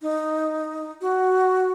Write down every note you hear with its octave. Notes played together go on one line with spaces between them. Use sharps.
D#4
F#4